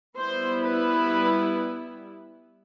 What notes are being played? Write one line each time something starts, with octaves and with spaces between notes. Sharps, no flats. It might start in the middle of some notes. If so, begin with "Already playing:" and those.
G3 B3 E4 C5
B4